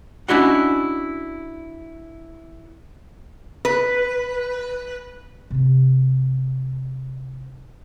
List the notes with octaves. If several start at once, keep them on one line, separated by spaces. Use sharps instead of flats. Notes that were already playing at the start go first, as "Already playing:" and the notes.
C#4 D4 E4 F#4 D#5 F#5
B4
C3 C4